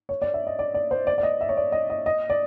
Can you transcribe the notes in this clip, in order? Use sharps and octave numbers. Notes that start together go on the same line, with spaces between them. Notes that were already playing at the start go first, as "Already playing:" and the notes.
C#5
D5
E5
D#5
D5
D5
C5
D5
D5
D#5
E5
C#5
D5
D#5
D#5
D#5
D5